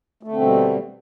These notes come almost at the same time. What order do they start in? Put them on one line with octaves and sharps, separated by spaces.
A3 D3 C4 B2 G3